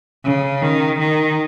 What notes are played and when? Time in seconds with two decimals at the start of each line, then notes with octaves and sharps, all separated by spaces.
0.25 C#3
0.62 D#3
0.99 D#3